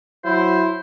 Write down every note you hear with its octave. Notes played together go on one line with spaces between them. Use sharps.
F#3 E4 C5